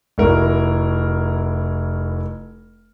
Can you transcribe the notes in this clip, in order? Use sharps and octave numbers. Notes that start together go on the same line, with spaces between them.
F1 E4 F#4 A#4